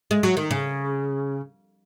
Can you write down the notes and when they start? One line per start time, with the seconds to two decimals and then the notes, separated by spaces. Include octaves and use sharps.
0.11 G#3
0.23 F#3
0.37 D#3
0.51 C#3